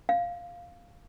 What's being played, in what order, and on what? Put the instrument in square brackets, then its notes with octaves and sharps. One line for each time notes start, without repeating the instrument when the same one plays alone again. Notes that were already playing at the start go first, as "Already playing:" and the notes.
[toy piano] F5